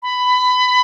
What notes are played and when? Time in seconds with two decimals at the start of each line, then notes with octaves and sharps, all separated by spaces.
0.03 B5